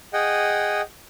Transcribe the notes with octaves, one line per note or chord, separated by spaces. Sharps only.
G#4 D#5 F#5 G5